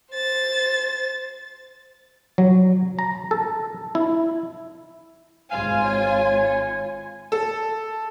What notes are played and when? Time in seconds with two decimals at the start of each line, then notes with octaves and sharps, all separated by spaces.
0.12 C5 A6
2.38 F#3
2.99 A#5
3.31 A4
3.95 E4
5.51 G#1 F4 F5 G#5
5.84 C#5
7.32 A4